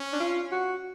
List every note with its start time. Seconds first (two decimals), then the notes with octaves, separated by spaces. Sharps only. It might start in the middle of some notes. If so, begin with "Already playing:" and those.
Already playing: C#4
0.13 D4
0.20 F4
0.52 F#4